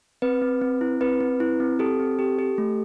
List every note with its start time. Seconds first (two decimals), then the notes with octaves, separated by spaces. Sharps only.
0.22 C4 B4
0.42 C4
0.61 C4
0.81 E4
1.01 C4 B4
1.20 C4
1.40 E4
1.60 C4
1.79 G4 A4
1.99 C4
2.19 G4
2.39 G4
2.58 A3